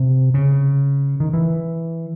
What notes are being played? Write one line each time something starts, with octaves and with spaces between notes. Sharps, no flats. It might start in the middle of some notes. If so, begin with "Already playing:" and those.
Already playing: C3
C#3
D#3
E3